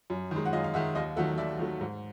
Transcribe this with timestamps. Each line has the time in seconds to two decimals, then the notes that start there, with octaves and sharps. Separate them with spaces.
0.10 F#2
0.31 D#3 G#3
0.45 F#5
0.53 F#2 D#5 F5
0.64 F5
0.74 D#3 G#3 E5 F#5
0.95 D#2 D#5 F5
1.16 D#3 F#3 A3 E5 F#5
1.38 D#2 D5 E5
1.59 D#3 F#3 A3
1.81 G#2